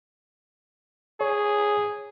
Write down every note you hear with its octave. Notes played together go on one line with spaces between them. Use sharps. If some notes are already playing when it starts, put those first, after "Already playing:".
G#4 C#5